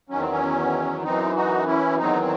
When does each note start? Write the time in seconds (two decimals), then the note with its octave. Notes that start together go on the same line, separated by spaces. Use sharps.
0.09 E2 D#3 F#3 C#4
0.21 C4
0.31 C#4
1.04 F#2 E3 C4 D#4
1.36 D#4 F#4
1.67 C#4 E4
1.99 E2 D#3 F#3 C4 D#4
2.22 C4